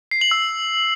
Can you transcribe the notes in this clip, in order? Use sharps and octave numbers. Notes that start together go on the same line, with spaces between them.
C7
F#7
E6